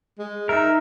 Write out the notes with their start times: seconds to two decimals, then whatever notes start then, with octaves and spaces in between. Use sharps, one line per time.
0.19 G#3
0.49 D#4 A#4 E5